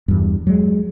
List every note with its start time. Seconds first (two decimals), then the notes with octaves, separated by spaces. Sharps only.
0.08 E2 G2
0.47 F#3 G#3